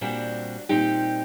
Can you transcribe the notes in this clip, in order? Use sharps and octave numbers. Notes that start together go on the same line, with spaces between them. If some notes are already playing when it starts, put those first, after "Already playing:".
A#2 G3 C4 D4 F#4
A#2 G3 C4 D#4 G4